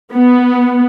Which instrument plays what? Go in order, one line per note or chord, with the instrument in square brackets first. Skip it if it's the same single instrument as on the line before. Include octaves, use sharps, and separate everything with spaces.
[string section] B3